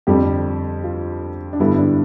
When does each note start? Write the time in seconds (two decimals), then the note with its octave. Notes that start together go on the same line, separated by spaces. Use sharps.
0.07 F2 D3 G3 C4 G4
0.84 F4
1.53 D4
1.60 G2 D3 G3 B3 E4
1.74 E4
1.78 D4